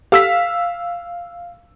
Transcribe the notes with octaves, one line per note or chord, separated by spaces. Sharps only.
G4 A4 F5 F#5 E6 B6